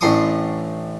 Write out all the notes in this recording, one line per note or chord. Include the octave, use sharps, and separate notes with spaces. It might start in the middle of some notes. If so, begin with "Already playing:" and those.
A1 A2 D4 C6 C#6 D#6